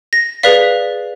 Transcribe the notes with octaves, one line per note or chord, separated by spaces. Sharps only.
A#6
G#4 B4 D5 F5 B6